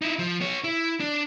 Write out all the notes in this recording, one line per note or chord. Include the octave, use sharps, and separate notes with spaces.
D#4 E4
F3
B3 C#5
E4
D4